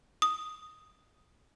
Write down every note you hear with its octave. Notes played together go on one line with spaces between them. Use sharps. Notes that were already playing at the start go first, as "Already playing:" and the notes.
D#6